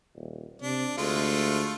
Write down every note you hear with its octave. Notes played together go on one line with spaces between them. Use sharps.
D#1
C3 D4
D2 G#3 A3 F4